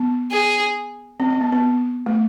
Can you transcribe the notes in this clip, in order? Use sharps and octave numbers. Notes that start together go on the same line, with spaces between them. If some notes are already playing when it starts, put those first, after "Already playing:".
Already playing: B3
G#4
C4
C4
B3
B3
A3